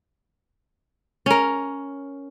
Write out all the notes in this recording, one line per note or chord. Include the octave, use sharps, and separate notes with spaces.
C#4 A#4